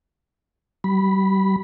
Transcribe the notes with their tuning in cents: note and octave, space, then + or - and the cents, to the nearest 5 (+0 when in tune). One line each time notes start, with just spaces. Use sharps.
G3 -35 B5 +0